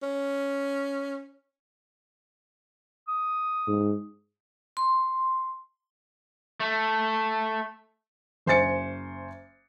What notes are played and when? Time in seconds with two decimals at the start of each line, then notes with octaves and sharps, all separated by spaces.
0.03 C#4
3.08 D#6
3.67 G#2
4.77 C6
6.60 A3
8.46 F#1 C5 G#5 A6 C#7